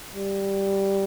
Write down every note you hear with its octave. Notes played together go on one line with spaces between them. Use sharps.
G3